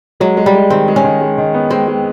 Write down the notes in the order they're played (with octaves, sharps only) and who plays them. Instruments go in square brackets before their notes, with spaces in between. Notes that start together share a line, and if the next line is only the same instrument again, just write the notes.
[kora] F#3 [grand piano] G#3
[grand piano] G#3
[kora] G3
[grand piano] G#3
[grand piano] D#3 [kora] C4
[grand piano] G#3
[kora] C#4
[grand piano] D#3
G#3
D#3
B3
[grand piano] G#3 [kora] C4
[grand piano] G#3